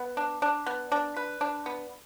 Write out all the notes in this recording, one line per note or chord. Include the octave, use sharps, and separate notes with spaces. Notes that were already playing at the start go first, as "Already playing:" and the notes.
Already playing: B3
D4
D4
B3
D4
B4
D4
B3